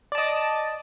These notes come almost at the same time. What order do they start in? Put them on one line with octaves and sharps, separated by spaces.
D5 A5 D#5